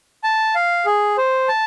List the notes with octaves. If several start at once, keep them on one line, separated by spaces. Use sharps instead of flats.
A5
F5
G#4
C5
A5